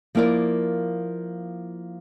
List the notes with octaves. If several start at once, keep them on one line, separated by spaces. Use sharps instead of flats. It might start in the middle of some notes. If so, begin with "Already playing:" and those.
F3 A#3 E4 A#4 D5